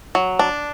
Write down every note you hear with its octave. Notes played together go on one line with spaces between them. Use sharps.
F#3
D4